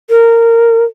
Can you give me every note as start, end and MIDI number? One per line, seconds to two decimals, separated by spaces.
0.10 0.84 70